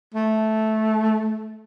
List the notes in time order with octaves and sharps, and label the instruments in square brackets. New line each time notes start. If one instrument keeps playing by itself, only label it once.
[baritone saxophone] A3